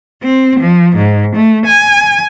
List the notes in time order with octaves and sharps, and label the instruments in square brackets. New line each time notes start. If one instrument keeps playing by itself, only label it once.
[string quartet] C4
F3
G#2
A3
G#5